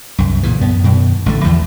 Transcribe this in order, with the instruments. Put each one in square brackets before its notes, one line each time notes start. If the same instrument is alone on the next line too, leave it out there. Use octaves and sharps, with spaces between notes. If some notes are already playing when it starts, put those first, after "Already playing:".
[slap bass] C2 F#2
A#2 C#3 E3
F#2 B3
F#2 B2 D#3
A1 D3 G3 A3
E2 E3 F3 A3